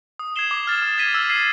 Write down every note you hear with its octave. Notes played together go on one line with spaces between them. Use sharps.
D#6
G#6 C7 E7 G7
D6
F6 A6
D#6
G#6 B6 D#7 G7
E6
A6 C7